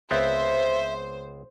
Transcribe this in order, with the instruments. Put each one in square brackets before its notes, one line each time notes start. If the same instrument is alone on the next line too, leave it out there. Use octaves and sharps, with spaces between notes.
[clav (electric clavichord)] C#2 B3 C4 [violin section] C5 [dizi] E5